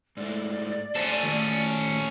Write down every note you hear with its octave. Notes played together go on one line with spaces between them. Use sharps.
G#2 A3 D5
A3 C#4 A4 C5
D#3 A3